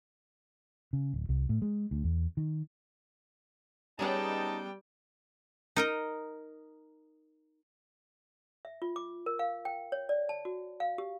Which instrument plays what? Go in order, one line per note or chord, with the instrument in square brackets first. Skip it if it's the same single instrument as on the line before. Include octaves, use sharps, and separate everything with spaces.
[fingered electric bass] C#3
D1
C2
A2
G#3
D2
E2
D#3
[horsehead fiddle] G3 G5 [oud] B3 C#4 G#4 [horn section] D#4 A5
[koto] D#4 A#4 D#5
[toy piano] E5
F4
D6
A#4
F5
G5
C#5
D5
A5
F#4
F5
G4